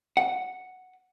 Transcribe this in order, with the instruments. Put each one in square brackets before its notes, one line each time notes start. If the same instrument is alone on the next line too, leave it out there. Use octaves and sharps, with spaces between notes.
[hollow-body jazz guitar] F#5